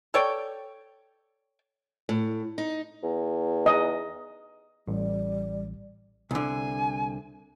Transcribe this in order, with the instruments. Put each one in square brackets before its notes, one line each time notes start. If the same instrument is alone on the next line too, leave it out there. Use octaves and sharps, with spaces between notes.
[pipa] A4 C#5 D5 G5
[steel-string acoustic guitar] A2
D#4
[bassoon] E2
[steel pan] D#5
[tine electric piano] A1 [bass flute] G3
[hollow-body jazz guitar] C2 D3 [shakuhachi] G#5